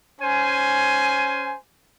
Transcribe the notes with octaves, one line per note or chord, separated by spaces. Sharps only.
C#4 C5 G#5